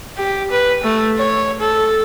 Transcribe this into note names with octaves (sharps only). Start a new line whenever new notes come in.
G4
B4
A3
C#5
A4